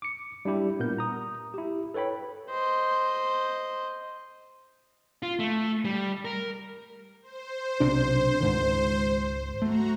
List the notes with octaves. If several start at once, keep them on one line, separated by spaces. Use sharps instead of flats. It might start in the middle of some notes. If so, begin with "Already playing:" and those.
D6 C#7
G3 D4 E4 G4
A#2 B3 A#4 G6
A#5 D#6
E4 G4
A4 B4 C#5 G5 B5
C5 D#5
F4
A3
G3
A#4
C5
B1 C3 D4
C#2 G#2 D#3
A3 F#4 A#5